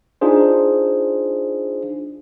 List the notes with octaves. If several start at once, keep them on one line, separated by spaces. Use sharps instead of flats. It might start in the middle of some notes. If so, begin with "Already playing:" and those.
D4 D#4 F4 G#4 C5